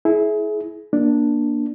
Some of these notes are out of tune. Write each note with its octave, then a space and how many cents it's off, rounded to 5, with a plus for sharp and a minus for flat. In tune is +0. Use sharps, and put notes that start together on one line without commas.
E4 -10 G#4 +30
A#3 +20 D4 +0